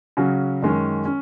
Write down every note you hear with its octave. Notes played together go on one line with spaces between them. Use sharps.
C#3 F#3 C#4 F#4
F#2 D#3 G#3 C#4
C#4